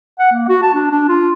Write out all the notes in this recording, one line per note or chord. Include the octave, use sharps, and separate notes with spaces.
F#5
A#3
F#4
A5
D4
D4
F4